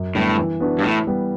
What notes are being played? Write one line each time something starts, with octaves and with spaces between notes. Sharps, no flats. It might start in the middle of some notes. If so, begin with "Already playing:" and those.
Already playing: F#2
A2 D3 G3 B3
E3
B3 D4 F#4
G2
A2 E3
G3 B3